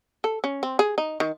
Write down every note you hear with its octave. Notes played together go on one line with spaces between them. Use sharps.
A4
C#4
C4
G#4
D#4
D#3